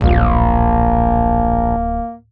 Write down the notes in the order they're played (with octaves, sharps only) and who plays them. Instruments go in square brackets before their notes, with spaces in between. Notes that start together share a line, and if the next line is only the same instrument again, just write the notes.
[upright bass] D1 [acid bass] A#1 [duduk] A#3